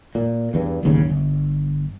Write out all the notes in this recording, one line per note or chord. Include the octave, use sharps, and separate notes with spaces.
A#2
E2 G2
D1 G1 D#2 C#3
G1